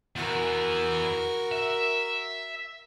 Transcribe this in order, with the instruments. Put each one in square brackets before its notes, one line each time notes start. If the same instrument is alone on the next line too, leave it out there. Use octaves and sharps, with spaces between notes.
[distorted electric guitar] E2 E3 [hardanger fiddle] F#4 A#4
[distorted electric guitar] E5